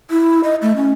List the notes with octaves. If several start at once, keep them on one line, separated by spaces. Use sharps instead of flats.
E4
D#5
A3
C#4